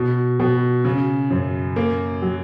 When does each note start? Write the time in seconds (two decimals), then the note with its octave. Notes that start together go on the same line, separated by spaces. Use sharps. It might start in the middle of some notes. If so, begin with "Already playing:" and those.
Already playing: B2
0.40 B2
0.85 C#3
1.30 F#2
1.76 A#3
2.22 F#3